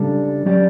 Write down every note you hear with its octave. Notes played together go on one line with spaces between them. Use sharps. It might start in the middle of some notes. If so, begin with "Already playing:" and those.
Already playing: C#3 G3 D4 A4
F#3 C#4 G4 D5